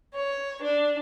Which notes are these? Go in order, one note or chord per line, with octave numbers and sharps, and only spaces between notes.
C#5
D4